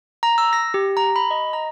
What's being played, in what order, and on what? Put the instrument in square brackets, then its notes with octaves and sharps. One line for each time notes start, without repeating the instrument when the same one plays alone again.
[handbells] A#5
E6
A#6
G4
A#5
B5
D#5
A#5